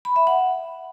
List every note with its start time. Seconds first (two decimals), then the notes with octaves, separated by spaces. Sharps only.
0.05 B5
0.16 E5
0.27 F#5